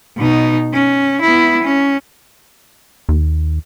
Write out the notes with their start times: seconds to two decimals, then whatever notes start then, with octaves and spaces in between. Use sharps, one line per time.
0.17 B2 D#4
0.73 C#4
1.21 B3 E4
1.62 C#4
3.09 D#2